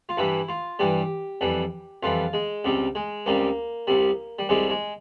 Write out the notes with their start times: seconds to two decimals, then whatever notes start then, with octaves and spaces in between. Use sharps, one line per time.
0.09 F4
0.17 G2 E3 G3 E4
0.49 F4
0.79 G2 E3 G3 G4
1.41 F2 E3 G3
2.03 F2 E3 G3 F4
2.33 G#3
2.64 C#2 C3 G3
2.95 G#3
3.26 C#2 C3 G3 A#3
3.87 C2 C3 G3
4.39 G3
4.49 C2 C3 G3 G#3
4.70 G#3